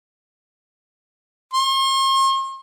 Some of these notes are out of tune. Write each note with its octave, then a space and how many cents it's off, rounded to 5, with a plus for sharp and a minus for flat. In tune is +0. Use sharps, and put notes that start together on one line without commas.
C6 +45